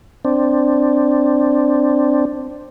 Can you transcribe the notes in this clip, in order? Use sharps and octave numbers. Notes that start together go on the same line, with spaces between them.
C4 D4